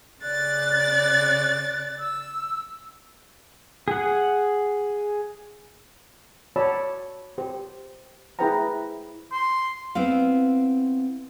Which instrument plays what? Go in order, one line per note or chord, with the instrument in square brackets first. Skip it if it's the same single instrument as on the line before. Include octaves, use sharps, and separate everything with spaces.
[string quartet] C#3 D5 A6 [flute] F#6
[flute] E6
[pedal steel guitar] G#4 F#5
[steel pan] F#4 C#5 D5 A5 B5 E6
G4 C5
E4 G#4 B4 C5 G5 A#5
[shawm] C6
[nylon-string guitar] B3 C4 E4 F5